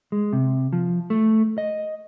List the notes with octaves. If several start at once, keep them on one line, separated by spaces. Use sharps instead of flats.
G#3
C3
F3
A3
D#5